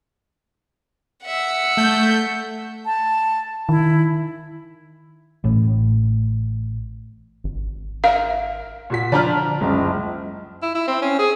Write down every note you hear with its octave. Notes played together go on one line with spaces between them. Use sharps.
E5 F#5
A3 G6
A5
D#3 E4
A1 A2
G#1
A#4 E5 F5
A#2 F#4 B6
D3 F3 D4 D5 A5 A#5 F6
F#1 C#2 G#3
E4
E4
C4
C#4
G#4